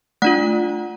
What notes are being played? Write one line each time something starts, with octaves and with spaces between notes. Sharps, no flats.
A3 D4 F4 F#5